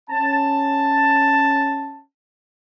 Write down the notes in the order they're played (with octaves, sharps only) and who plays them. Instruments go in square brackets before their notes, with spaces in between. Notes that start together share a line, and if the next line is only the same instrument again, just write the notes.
[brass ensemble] C#4 A5